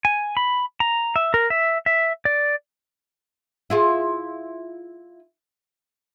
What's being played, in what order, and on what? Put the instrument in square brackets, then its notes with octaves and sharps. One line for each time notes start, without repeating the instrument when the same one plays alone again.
[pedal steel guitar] G#5
B5
A#5
E5
A#4
E5
E5
D5
[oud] E4 F4 G#4